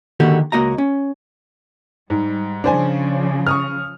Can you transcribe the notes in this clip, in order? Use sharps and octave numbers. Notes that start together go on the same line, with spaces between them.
D3 D#3 A#3 F#4 G4 A4
C#2 A#3 F#4 D#5 A#5
C#4
G#2 G3
C#3 F3 D4 C5 G#5
C#6 D#6 F6